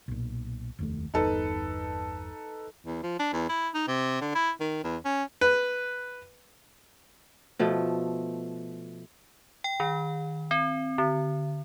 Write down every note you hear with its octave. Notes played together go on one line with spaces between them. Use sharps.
B1 A#2
F1 D#2 A3
G1 E2 D#4 A4 B4
E2
F3
D4
E2
E4
D#4
C3
D3
E4
D#3
E2
C#4
B4
B2 F3 A3
G5
D#3
C4
D3